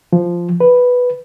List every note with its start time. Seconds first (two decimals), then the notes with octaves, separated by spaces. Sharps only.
0.13 F3
0.60 B4